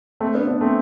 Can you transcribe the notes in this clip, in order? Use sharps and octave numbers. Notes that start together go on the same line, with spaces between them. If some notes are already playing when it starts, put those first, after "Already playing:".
A3 C4
B3 D4
B3 D4
A3 C4